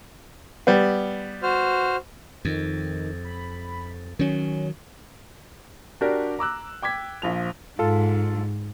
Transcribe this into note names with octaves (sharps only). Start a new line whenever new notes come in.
G3 B3
F#4 C5 F6
F2 D#3
B5
D#3 F#3 C#4
D4 F#4 G4 A#4 D5
A#5 D6 E6 F#6
G5 D6 G#6 B6
A#1 F3 F7
G#2 F4 A4